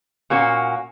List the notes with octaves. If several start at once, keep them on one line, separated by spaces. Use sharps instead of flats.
A#2 A#3 C#4 F#4